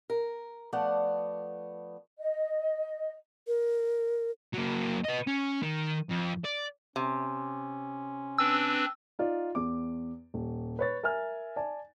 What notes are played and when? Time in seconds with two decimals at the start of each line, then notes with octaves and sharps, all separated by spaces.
0.10 A#4
0.73 F3 A3 B3 D5 F#5
2.18 D#5
3.47 A#4
4.54 F#3 A#3
5.05 B4 D#5
5.27 C#4
5.63 D#3
6.10 F2
6.45 D5
6.96 C3 C#4
8.38 C4 D4 B4 E6
9.19 D#4 F4 D5
9.55 E2 D6
10.34 D#1
10.79 B4 C#5 A6
11.03 A#4 E5 G#5 F6
11.56 D5 G#5 A5